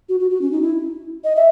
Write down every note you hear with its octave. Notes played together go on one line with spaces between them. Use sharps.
F#4
F#4
F#4
C#4
D#4
E4
D#5
E5